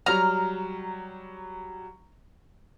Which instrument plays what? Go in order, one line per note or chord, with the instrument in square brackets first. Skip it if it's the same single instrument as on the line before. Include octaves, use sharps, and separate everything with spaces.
[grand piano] F#3 G3 [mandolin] A#5 F6